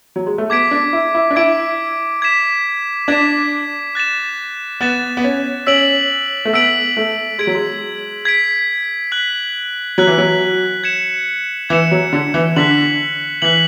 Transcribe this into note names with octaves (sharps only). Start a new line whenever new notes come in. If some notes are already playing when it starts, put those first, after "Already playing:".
F#3
G#3
A3
B3 D6 G#6 B6 D7
D4
E4
E4
D4
E4 D6 G#6 B6 D7
G#6 B6 E7
D4 G#6 B6 E7
F#6 A6 E7
B3 F#6 A6 E7
B3
C#4
C#4 E6 B6 D7 F#7
A3
B3 E6 B6 D7 F#7
A3
G#3 G#6 B6 D7
F#3
G#3
G#6 B6 D7
F#6 B6 F#7
F#3 F#6 B6 F#7
E3
F#3
G#6 C#7 E7
E3 G#6 C#7 E7
F#3
D3
E3
D3 F#6 B6 F#7
E3 F#6 B6 F#7